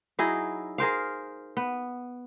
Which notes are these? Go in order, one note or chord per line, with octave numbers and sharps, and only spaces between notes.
F#3 D#4 E4 G#4
G#4 A#4 C5 F5
B3